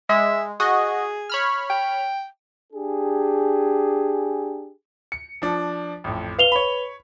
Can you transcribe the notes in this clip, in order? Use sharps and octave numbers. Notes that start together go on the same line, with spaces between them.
G#3 E5
F#4 G#4 D#5
C#5 B5 F6
G5
D4 G4 G#4
C#7
F3 D4
A1 F2
B4 F5 F7 G7
C#5 B5